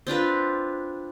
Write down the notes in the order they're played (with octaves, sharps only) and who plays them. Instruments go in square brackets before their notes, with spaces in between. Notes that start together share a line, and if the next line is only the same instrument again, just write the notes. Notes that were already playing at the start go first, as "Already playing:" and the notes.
[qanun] C4 D4 F4 B4